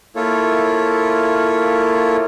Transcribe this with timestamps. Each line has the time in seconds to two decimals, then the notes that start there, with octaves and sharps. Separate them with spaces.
0.16 A#3 E4 F4 A4 C#5